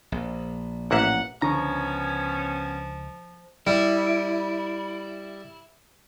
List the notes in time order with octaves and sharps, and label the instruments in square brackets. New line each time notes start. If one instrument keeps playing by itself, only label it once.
[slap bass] A#1
[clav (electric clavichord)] A1 A#3 E5 [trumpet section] F#5
[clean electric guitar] C#2 A#5 [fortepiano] D3 C#6 [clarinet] F3 [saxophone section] B3 C#4
[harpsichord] G3 [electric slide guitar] E4